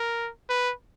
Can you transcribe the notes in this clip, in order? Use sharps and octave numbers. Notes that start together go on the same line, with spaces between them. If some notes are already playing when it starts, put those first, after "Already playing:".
Already playing: A#4
B4